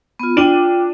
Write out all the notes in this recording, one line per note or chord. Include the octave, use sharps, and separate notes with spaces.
B3 F4
D4 F4 G5 D#7 F#7